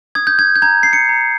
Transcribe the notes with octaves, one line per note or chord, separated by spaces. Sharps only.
D#6 G#6
G6
G#6
G6
A#5 G#6
C7
C#7
A#5